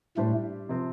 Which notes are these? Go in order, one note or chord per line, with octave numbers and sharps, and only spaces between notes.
A2 G3 A3 D4 G4 C5
C3 F3 C4